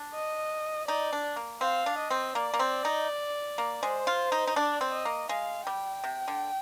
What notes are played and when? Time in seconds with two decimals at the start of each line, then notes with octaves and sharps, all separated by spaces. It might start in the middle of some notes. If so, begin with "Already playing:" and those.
Already playing: D4
0.14 D#5
0.87 D#4 D5
1.13 D4
1.36 A#3
1.61 C4 F5
1.86 D4
1.98 D#5
2.10 C4
2.35 A#3 D5
2.54 A#3
2.59 C4
2.85 D#4
3.58 A#3
3.83 G#3 C5
4.07 F4
4.32 D#4
4.47 D#4
4.56 D4 D5
4.81 C4
4.92 D#5
5.05 A#3
5.29 G#3 F5
5.67 G3 G5
6.04 C3
6.28 D3